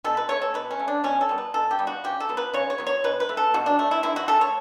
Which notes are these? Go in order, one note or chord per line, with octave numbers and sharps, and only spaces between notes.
B2 A4
B4
A3 C#5
A4
B2 B4
C#4
A3
D4
B2 C#4
A4
G3 B3
B4
B2 A4
G4
G3 B3
F#4
C#3 G4
A4
F#3 B3
B4
C#3 C#5
C#5
F#3 B3
C#5
B2 B4
B4
A3
A4
B2 F#4
D4
A3
E4
D3 E4
F#4
A3 A4
C#5